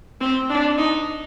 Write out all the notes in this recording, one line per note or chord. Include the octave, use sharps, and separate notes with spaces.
C4
D4
D#4